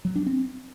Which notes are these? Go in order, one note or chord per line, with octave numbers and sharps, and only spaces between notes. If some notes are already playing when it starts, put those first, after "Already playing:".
F#3
D4
C4